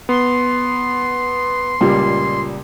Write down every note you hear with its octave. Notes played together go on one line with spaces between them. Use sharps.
B3 C6
C#2 A#2 G3